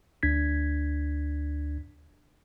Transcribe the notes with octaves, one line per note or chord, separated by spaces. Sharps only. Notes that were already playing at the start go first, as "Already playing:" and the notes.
D2 D4 G#6 B6